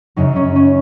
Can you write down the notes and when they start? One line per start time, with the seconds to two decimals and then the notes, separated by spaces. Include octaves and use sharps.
0.16 F#2 C#3 F#3 D#4
0.36 C#4
0.55 C#4